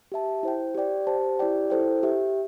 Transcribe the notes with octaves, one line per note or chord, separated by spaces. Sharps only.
G4 E5 A5
E4 C5 G5
G4 D5 G5
G4 C5 A5
E4 G4 D5 G5
E4 A4 C5 G5
G4 E5 G5